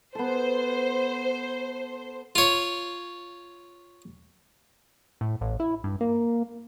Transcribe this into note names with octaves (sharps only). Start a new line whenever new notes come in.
B3 A4 C5
F4 C#5
A2
A1
E4
G2
A#3